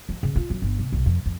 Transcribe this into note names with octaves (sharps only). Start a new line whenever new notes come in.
F3
C#3
F4
F#2
G1
C3
B1
F2
F2